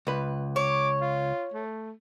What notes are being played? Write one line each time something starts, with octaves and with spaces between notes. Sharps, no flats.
C#2 B4
C#5 D6
F4
A3